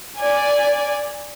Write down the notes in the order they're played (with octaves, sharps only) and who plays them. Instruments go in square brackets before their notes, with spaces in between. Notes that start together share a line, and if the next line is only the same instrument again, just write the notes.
[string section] D5 G#5